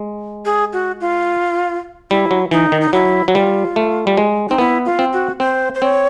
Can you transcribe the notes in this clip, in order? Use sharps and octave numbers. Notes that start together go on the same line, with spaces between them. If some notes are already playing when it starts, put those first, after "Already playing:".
Already playing: G#3
G#4
F#4
F4
G3 E4
F#3
E3 D#4
D#3
D#4
F#3 E4
F#3
G3 F4
A3
G3
G#3
C4 D#4
B3 E4
F4
C4
F#4
C4 C5
C5
C4 C#5